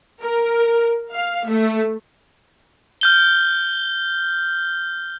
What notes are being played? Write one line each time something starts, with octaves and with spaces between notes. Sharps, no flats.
A#4
F5
A3
F6 G6 G7